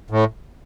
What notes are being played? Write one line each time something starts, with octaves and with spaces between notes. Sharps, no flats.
A2